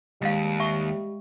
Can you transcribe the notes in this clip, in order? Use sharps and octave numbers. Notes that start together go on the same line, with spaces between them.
D#2 G3 G#3 D#5 F5
E5 C#6